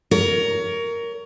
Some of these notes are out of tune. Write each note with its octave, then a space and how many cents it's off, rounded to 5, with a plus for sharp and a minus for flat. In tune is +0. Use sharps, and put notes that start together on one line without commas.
A#4 +0 C#5 +25